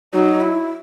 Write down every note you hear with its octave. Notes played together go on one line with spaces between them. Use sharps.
F#3 D#4
E4